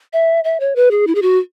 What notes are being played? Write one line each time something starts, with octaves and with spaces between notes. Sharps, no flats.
E5
E5
C#5
B4
G#4
E4
G#4
F#4